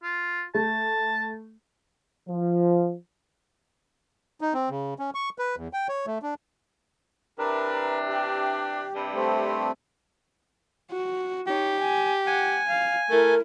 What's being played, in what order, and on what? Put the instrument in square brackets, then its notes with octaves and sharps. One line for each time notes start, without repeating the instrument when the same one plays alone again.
[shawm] F4
[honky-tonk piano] A3 [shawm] A5
[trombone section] F3
[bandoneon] D#4
C4
C#3
C#4
C#6
B4
E2
G5
C#5
A3
D4
[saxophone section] C3 E3 D4 [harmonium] A#4 B4
[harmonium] G4
[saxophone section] G2 C3 G3
[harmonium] A3 C4
[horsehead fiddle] F#4
[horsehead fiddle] D#4 C#5 [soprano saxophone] G4
[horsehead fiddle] G#5
[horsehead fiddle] F#5 [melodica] G#5
[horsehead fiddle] F5
[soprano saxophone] A3 [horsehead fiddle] E4 [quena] A#4